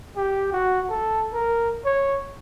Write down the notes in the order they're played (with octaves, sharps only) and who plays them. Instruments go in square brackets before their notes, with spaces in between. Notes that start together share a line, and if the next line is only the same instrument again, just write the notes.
[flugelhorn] G4
F#4
A4
A#4
C#5